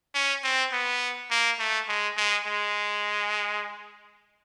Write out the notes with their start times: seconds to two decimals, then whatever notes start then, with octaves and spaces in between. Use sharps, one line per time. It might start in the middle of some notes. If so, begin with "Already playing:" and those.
0.14 C#4
0.44 C4
0.72 B3
1.31 A#3
1.59 A3
1.88 G#3
2.17 G#3
2.46 G#3